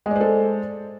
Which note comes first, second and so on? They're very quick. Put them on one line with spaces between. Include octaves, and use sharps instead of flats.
G#3 D5 C5 A4